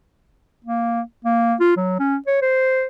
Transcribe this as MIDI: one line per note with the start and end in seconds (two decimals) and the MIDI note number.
0.65 1.01 58
1.24 1.54 58
1.60 1.75 65
1.77 1.99 54
1.99 2.16 61
2.27 2.40 73
2.41 2.87 72